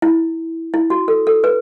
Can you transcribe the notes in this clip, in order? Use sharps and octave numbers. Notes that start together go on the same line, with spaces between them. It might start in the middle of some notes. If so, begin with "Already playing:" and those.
E4
E4
F#4
A4
A4
B4